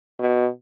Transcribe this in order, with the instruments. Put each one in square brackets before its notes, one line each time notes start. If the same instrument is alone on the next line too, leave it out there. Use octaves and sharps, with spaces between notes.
[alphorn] B2